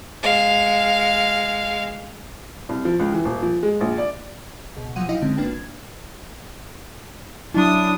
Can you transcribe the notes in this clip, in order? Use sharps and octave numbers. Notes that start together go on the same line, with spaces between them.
G#3 F5
C2
F3
C#2
E3
D#1
F3
G#3
A#1
D5
C#2 B2
A#2 F3 F#3 F#5 D#7
D#4 E4 D#5 F5 G5
D3 G#3 C4 C#4
G#1 A#3 D4 B4 G5
G#6
F#3 D4 E4 D#6